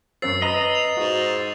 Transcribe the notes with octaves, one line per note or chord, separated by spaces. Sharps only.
F#2 C#5 E6 A6 C7
B4 D#5 A#5 B5
F7
G#2 F#4